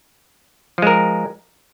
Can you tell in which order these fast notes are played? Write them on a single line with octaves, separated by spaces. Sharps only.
F3 G#3 A#4